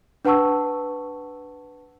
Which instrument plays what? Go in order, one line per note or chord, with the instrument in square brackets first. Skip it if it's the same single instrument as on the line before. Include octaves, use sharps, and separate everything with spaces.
[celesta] D4 B4 F#5 A5 C#6 E6